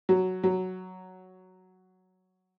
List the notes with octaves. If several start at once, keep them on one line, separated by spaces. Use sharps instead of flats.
F#3
F#3